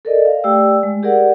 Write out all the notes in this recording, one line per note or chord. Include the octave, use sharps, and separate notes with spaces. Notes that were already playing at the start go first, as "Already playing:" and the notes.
A4 A#4 D5 D#5
F5
A3 G4 D5 G5 E6
G#3
G4 G#4 A#4 D5 F#5